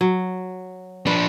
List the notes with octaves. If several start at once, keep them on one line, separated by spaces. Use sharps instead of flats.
F#3
F3 D4 B4